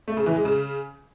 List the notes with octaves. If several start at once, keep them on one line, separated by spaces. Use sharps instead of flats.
A3
C#3
E3
G#3
C#3